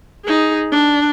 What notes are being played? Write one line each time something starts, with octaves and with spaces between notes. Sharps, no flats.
D#4 G#4
D4